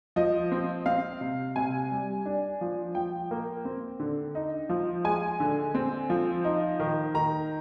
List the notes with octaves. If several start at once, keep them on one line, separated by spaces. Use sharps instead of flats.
F3 D#5
C4
C4 F5
C3
C3 G#5
G3
D4
F3
F3 G5
A#3
C4
D3
D#4
F3
G#3 G#5
D3
C4
F3
D#4
D#3
D#3 A#5